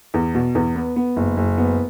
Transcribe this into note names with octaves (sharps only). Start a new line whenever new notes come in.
E2
B2
E2
B3
B3
F#1
F#1
B3